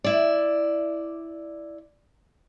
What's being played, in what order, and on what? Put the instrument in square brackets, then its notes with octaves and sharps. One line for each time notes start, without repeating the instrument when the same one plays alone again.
[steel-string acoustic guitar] E4 D5